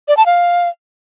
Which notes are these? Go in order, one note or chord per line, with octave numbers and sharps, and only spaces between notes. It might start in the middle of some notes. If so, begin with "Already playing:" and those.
D5
A5
F5